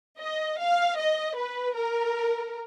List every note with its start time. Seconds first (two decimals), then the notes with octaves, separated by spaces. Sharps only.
0.20 D#5
0.59 F5
0.97 D#5
1.36 B4
1.75 A#4